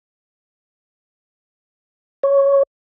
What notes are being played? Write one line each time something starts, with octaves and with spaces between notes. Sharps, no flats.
C#5